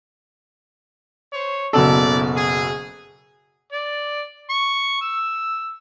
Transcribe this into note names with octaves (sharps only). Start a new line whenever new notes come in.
C5 C#5
F#1 B2 E4 A4 D5
G#4
D5
C#6
E6